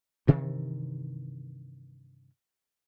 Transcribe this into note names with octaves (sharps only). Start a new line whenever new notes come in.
G2 C3 D#3 E3